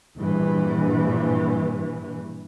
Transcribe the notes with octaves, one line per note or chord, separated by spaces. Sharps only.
A#1 G2 E3